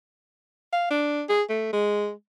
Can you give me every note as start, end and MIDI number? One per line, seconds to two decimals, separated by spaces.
0.72 0.90 77
0.91 1.23 62
1.29 1.42 68
1.49 1.72 57
1.73 2.11 56